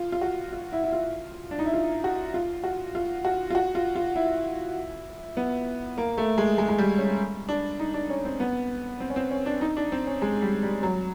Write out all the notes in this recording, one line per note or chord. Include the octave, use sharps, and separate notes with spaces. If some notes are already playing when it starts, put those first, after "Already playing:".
Already playing: F4
F4
F#4
F4
E4
E4
F4
D4
D#4
E4
F4
F#4
F4
F#4
F4
F#4
F4
F#4
F4
F4
E4
B3
A#3
A3
G#3
G#3
G#3
G3
C#4
D4
D#4
D4
C#4
C4
B3
C4
C#4
C4
C#4
D4
D#4
D4
C4
C#4
G#3
G3
G3
F#3